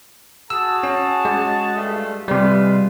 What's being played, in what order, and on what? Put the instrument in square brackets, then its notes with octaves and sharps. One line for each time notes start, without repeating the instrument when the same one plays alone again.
[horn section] F#4 G#4 A5 [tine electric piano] E6
[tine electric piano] C#4
G#3
[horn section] G2 A3 F4
[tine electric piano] C3 G3 [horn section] G#3 F4 B4